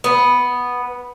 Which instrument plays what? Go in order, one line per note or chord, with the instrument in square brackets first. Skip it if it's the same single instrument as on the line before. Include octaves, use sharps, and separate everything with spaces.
[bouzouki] B3